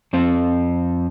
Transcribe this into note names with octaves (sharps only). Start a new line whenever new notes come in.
F2 C4 C5